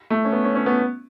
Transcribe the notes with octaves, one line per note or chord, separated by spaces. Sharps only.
A3
C#4
B3
C#4
C#4
B3